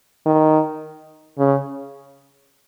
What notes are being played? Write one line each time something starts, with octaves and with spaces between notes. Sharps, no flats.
D#3
C#3